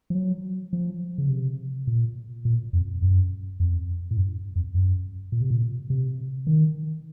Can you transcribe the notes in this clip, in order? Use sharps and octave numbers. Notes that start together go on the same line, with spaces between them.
F3
F#3
F3
C#3
C3
A#2
A#2
F2
F#2
F2
A2
F#2
F2
F#2
A#2
C3
A#2
C3
D#3